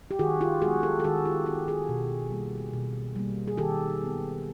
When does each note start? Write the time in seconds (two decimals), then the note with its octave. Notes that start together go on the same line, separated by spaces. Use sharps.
0.11 G4
0.19 D#3 F#4 G#4
0.41 F4 G4
0.62 G#3 B3 F#4 G#4
0.83 G4 A4
1.00 A4
1.04 D#3 F#4 G#4
1.25 F4 G4
1.46 G#3 B3 F4 G4
1.68 F#4 G#4
1.89 B2
2.31 G3 A#3
2.73 B2
3.16 G3 A#3
3.48 G#4
3.58 D#3 G4 A4
4.01 G#3 B3